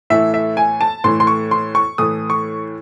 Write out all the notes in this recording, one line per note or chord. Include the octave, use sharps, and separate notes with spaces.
A2 E3 A3 E5
E5
G#5
A5
A2 E3 A3 C6
C6
C#6
C6
C#6
A2 E3 A3 D#6
C#6